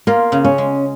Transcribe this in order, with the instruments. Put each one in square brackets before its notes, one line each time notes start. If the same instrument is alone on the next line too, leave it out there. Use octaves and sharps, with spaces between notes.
[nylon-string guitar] A#3 [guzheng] F4
[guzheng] C#3
[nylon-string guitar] C#4
[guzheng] G#3